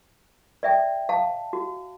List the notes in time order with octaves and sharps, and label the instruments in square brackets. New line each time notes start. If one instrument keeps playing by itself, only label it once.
[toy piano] D5 E5 G5
F5 A5
F#4